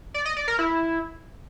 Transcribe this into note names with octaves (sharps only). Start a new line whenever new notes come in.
D5
D#5
D5
A#4
E4